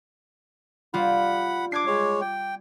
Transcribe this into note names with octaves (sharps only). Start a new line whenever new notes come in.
G3 F4 F#5 B5
D4 D6 G#6 C7
G#3 C#5
G5